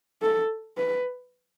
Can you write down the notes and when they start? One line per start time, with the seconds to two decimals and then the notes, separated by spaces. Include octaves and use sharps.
0.22 A4
0.77 B4